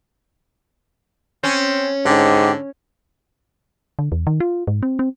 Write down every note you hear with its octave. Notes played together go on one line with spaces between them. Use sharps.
C4 C#4
G#2 D3 G4
D3
E2
D#3
F4
G#2
C4
C4